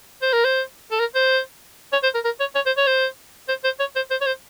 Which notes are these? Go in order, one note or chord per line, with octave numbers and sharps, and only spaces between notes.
C5
A#4
C5
A4
A#4
C5
C#5
C5
A#4
A#4
C#5
C#5
C5
C#5
C5
C5
C5
C#5
C5
C5
C#5
C5